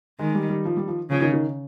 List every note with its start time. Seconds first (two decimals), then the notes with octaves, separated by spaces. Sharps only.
0.19 D#3 G#3
0.35 G3
0.49 G3
0.65 F3
0.77 G3
0.88 F3
1.10 C#3 F3
1.22 D#3
1.34 D#3